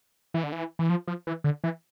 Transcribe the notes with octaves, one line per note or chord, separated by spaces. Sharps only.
E3
D3
E3
E3
F3
F3
E3
D3
E3